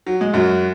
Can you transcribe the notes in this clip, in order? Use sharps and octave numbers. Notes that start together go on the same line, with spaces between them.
F#3
G#3
F#2 F#3